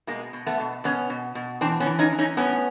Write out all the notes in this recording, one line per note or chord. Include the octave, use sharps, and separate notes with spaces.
B2 G#3 A#3
B2
A3 B3
B2
B2 B3 C#4
B2
B2
E3 C4 D4
B3 C#4
E3
C#4 D#4
E3
C#4 D#4
A2 B3 C#4